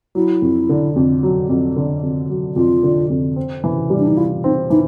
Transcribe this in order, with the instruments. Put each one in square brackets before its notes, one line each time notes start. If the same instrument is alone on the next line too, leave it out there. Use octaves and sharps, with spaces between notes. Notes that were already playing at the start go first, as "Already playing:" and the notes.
[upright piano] F#3 [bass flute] E4
[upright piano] F2
D3
F2
F#3
F2
D3
F2
F#3
[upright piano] F2 [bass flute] F4
[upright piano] D3
F2
C4
E3
G3
[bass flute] D4
D#4
[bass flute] E4 [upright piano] F4
[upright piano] C4 [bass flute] D#4
[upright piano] E3 [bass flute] D#4